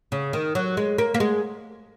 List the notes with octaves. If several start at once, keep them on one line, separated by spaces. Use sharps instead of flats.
C#3
D#3
F#3
G#3
A#3
A#3
G#3